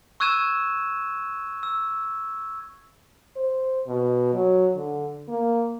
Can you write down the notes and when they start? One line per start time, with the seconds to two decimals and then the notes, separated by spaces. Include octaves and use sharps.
0.20 C#6 E6 F#6 G#6 D#7 E7
1.63 E6
3.36 C5
3.87 B2
4.34 F#3
4.76 D3
5.29 A#3